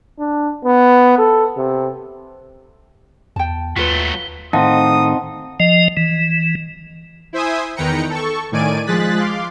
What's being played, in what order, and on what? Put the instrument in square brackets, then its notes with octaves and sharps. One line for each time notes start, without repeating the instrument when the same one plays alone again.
[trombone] D4
B3
A4
C3
[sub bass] E2 [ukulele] G5 A5
[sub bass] D#2 [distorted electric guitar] F#3 A3 [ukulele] F4 B4 [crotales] B6 G7
[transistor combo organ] A2 D#3 [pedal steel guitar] C4 D#4 [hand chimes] F5 F#5 A5 [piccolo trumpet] D#6
[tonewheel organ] F3 D#5
E3
[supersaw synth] E4 C5 E5 G#5 D#6
E2 D#3 B4 G5 A#5 C#7
A4 C#6
A2 D#3 D5 G#5 D7 D#7
F3 G#3 G#4 F#6 A6 B6
F5 C6 D6